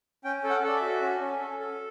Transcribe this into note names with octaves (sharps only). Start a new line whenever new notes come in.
C#4 G5
A4
F#5
A4 D5
E5
F#4
C#4
C#4
A4
A4